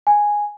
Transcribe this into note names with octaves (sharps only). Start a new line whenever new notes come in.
G#5